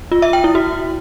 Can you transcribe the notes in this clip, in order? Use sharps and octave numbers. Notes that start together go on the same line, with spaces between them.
F4
E5
G5
E4
F#4